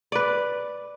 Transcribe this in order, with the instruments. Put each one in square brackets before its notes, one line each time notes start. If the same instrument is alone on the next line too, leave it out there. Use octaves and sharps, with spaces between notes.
[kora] B4 D5